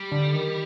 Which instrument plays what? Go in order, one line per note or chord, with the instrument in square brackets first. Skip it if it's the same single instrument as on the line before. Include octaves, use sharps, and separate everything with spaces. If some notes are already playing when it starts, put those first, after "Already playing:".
Already playing: [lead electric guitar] G3
[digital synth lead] D3
D#3